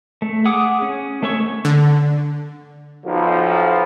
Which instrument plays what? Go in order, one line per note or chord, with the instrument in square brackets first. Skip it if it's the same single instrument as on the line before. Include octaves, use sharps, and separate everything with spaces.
[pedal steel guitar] A3
G#4 F#5 D6 D#6
C#4
A3 C#4 A4 C#5 C#6
[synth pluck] D3
[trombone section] B1 F3